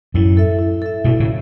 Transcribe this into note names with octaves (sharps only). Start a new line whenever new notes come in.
F#2 A2 E4
A4 E5
E4
A4 E5
G2 B2 E4
A2 C#3